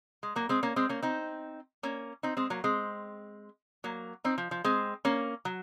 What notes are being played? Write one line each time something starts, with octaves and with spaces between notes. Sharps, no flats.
G#3
F#3 A#3
G#3 C4
A#3 C#4
G#3 C4
A#3 C#4
C4 D#4
A#3 C#4
C4 D#4
G#3 C4
F#3 A#3
G#3 C4
F#3 A#3
C4 D#4
F3
F3
G#3 C4
A#3 C#4
F#3